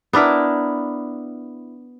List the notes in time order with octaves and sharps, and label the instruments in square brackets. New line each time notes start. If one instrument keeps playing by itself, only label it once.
[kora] B3 D4 E4 A#4